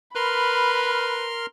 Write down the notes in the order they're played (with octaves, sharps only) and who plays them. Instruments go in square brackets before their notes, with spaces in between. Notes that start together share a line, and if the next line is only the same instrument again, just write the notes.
[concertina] A#4 C6 F6 [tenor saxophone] B4 [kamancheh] B5